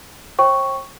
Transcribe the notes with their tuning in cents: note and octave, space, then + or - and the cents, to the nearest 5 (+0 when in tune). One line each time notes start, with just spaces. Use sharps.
C5 +45 G5 +0 C#6 +0